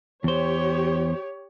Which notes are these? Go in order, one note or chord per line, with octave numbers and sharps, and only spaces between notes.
E2 G4 C5 C#5